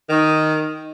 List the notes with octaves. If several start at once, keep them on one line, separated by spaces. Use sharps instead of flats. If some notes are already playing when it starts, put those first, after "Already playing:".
D#3